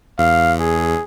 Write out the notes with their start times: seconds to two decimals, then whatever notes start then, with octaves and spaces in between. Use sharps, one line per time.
0.19 E2 F5
0.60 G#4